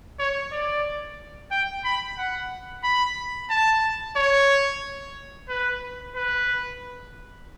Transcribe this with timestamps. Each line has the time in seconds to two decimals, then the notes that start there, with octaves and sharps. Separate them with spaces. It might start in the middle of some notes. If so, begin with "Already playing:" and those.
0.19 C#5
0.52 D5
1.51 G5
1.85 B5
2.18 F#5
2.84 B5
3.50 A5
4.16 C#5
5.49 B4
6.16 B4